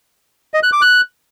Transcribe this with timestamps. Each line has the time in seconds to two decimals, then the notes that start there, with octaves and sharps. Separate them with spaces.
0.54 D#5
0.63 F#6
0.72 D6
0.82 F#6